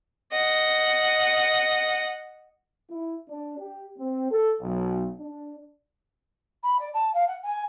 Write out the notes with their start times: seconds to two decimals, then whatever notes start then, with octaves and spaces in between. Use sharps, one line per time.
0.32 D#5 F#5
2.90 E4
3.29 D4
3.58 G4
3.98 C4
4.31 A4
4.61 B1
5.20 D4
6.63 B5
6.79 D5
6.94 A5
7.14 F5
7.27 F#5
7.43 G#5